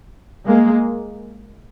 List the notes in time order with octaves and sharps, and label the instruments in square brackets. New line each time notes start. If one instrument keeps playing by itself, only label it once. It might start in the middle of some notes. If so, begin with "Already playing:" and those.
[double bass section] G#3 A#3